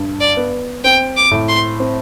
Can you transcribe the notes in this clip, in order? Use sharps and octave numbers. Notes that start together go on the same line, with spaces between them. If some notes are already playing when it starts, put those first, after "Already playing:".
Already playing: G2
D5
B3
C4 G5
D6
A2
C6
C4